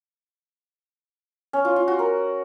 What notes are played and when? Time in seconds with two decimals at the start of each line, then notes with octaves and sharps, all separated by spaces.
1.53 C#4
1.65 F4
1.76 F4
1.88 F#4
1.99 A#4